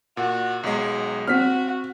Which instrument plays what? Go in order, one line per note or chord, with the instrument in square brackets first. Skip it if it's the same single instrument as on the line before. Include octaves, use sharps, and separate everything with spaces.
[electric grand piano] A#2 [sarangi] F#4
[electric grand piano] B1 G#3 [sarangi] F#3
[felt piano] C4 [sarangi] F#4 [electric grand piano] F6 B6